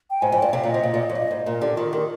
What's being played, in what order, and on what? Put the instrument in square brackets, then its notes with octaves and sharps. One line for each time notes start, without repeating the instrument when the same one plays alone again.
[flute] G5
[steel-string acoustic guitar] G#2 [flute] G#5
[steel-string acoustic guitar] F2
[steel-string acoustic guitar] G2 [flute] G5
[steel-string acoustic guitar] C3 [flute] F5
[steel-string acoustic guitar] A#2
[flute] D#5
[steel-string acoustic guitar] C3
A#2
A#2
F2
[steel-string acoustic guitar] G2 [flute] D#5
[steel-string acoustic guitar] G#2
[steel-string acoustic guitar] A#2 [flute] A#4
[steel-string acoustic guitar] D3 [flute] G4
[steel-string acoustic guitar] D#3 [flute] F4
[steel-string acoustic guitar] D#3 [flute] G4